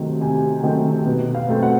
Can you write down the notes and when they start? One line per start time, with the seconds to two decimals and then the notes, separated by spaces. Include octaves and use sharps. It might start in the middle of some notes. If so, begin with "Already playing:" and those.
Already playing: C3 D#3 F#3 A3 C4
0.21 C3 G#5
0.63 D#3 F#3 A3 C4 G5
1.06 B2
1.35 F5
1.48 F#3 A3 C4
1.63 F#5